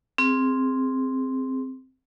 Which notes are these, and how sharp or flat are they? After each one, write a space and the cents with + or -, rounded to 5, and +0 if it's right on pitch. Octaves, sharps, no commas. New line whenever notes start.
C4 +0 G#4 +0